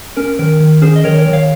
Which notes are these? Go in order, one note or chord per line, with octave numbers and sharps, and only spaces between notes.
C#4 A#4
D#3 A#4
D#3
C#4 G#4 C5
D#5
D#3 A#4 C#5
A#4 C#5
D#3
C#5 F5